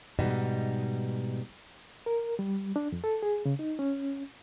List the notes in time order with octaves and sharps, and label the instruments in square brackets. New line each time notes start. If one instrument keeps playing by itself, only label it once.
[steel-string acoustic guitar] G#2 B2 G3 D#4
[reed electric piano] A#4
G3
D4
F2
A4
G#4
C#3
D#4
C#4